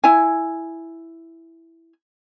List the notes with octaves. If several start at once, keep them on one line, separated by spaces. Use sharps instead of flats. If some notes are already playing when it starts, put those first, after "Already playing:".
E4 G#5